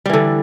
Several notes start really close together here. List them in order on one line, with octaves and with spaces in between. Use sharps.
G3 E3 D3